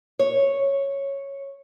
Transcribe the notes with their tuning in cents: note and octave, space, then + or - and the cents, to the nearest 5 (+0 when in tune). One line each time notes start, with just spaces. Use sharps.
C#5 -5